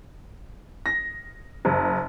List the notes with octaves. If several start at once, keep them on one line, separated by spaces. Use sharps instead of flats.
A#6
F#1